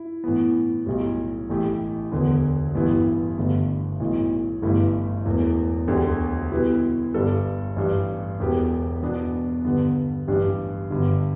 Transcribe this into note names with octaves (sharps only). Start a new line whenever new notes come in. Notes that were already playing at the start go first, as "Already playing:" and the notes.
Already playing: E4
A2 E3 B3
B1 A2 G3
A1 A2 A3 G4
E1 D2 D3 B3
A1 G2 E3 B3 E4
G1 G2 D3 A3
B1 A2 E3
G1 G2 E3 A3 E4
E1 E2 E3 A3
E1 D2 D3 A3 G4
B2 G3 E4 B4
G1 G2 G3 D4 A4
A1 G2 G3 D4
E1 E2 B2 B3 G4
E2 B2 B3 D4
G2 D3 B3
A1 G2 G3 D4 G4
G1 G2 D3